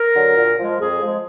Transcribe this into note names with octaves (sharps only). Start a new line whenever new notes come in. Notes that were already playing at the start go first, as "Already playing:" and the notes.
Already playing: A#4
D3 F#3
A#2
F3 G#3
F2 G#4
F3 G#3